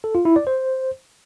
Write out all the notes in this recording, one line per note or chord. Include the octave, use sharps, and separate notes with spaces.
A4
F4
E4
D5
C5